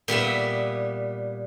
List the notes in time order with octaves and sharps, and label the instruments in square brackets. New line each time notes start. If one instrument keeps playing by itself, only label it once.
[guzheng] A#2 G3 B3 E5